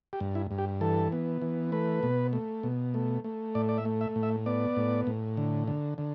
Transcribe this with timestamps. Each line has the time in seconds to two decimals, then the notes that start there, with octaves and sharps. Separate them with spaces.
0.13 G4
0.20 G2
0.35 E4
0.51 G2
0.58 G4
0.81 E3 A4
1.12 B3
1.42 E3
1.72 A3 B4
2.03 B2
2.33 A3
2.63 B2
2.94 A3
3.24 A3
3.55 A2 D5
3.69 D5
3.78 E5
3.85 A3
4.01 E5
4.16 A2
4.23 E5
4.46 B3 D5
4.76 A2
5.07 A2
5.37 D3
5.68 D3
5.98 D3